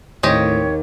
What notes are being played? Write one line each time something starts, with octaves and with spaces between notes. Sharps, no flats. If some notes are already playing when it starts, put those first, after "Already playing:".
D#2 A2 C4 G4 C#5 D#5